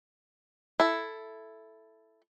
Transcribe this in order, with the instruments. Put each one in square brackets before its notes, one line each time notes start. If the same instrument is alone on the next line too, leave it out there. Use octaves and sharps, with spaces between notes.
[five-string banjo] E4 A4